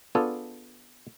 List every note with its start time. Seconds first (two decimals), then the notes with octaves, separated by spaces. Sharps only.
0.15 B3 D4 F4 G#4 A4